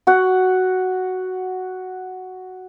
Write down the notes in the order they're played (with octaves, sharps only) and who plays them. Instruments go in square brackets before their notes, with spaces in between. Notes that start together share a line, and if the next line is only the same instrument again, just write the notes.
[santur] F#4 F#5